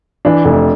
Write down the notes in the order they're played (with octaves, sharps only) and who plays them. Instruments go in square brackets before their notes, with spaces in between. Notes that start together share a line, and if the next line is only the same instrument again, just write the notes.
[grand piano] E3 [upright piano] D4
[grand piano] F1